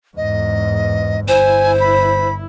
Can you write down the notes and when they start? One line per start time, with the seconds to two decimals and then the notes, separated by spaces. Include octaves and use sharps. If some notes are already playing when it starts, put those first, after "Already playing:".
0.17 E2 G#2 D#5
1.28 G1 E4 C5 G#5
1.80 B5